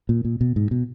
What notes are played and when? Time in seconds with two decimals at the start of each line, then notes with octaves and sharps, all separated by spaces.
0.09 A#2
0.25 A#2
0.41 B2
0.56 G#2
0.71 B2